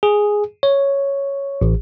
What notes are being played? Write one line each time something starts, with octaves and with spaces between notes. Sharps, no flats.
G#4
C#5
A1